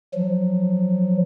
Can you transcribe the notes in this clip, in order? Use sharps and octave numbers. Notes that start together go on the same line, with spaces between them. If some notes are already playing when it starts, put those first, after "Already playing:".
F3 F#3